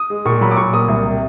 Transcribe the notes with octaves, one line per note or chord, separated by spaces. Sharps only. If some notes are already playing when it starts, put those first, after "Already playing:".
Already playing: D#6
G#3
A#2 C#6
F#3 B5
D6
A#2 C#6
A#3 D#6
C2
C3